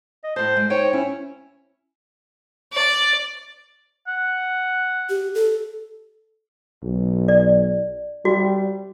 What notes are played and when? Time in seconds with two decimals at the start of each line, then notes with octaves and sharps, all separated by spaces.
0.24 D#5
0.36 A2 C5 A5
0.57 G#3
0.70 D#4 C5 C#5 G5
0.93 C#4 E4
2.73 D5
4.08 F#5
5.09 G4
5.35 A4
6.83 B1
7.28 D5
8.25 G3 F#4